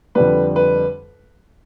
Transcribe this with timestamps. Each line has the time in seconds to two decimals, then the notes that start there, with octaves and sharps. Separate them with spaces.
0.15 F2 D3 G3 B4
0.56 B4